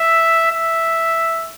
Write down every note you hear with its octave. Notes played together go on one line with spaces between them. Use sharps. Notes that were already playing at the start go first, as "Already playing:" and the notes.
Already playing: E5
E5